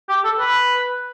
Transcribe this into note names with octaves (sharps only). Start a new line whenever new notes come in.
G4
A4
B4